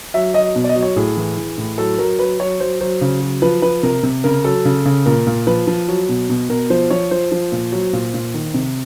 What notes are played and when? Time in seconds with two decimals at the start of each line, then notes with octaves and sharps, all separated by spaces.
0.14 F#3 E5
0.34 F#3 D#5
0.55 B2
0.64 D5
0.69 D#5
0.76 F#3
0.82 C#5
0.96 A2 G#4
1.17 E3
1.37 E3
1.58 A2
1.78 F#3 A4
1.99 F#3 A#4
2.19 F#3 B4
2.39 F#3 C#5
2.60 F#3 C5
2.81 F#3 C5
3.01 C#3
3.22 F#3
3.42 F3 B4
3.62 F3 B4
3.83 C3 A#4
4.03 C3
4.24 C#3 A#4
4.44 F#3 A4
4.65 C#3
4.85 C#3
5.06 A#2 A#4
5.27 A#2
5.47 F3 B4
5.67 F3
5.88 F#3
6.09 B2
6.29 B2
6.49 B2 A#4
6.70 F3 C5
6.90 F3 C#5
7.11 F3 C5
7.32 F3
7.52 A#2
7.72 F#3
7.93 A#2
8.14 A#2
8.34 D#3
8.54 C3